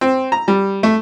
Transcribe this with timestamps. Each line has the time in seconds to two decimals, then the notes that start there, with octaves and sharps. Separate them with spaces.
0.01 C4
0.32 A#5
0.48 G3
0.83 A3